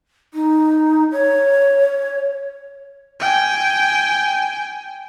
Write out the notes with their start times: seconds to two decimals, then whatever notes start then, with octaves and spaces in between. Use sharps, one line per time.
0.34 D#4
1.12 C#5
3.20 G5 G#5